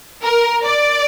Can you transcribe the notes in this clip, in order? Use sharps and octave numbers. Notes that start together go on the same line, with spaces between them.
A#4
D5